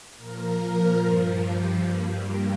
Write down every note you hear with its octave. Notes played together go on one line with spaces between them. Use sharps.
A#2 F3 A#4
G2 F3
G4
G2 G3 A#3
A#3